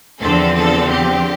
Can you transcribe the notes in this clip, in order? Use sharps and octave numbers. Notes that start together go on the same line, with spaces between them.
E2 D3 F3 C4 A4
A4
G4